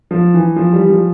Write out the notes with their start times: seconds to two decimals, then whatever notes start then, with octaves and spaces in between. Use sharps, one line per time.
0.11 F3
0.34 E3
0.56 F3
0.73 E3 G3
0.90 F3